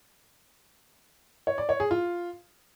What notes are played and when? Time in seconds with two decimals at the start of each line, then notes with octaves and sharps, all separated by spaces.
1.47 C#5
1.58 D5
1.69 C#5
1.80 G#4
1.91 F4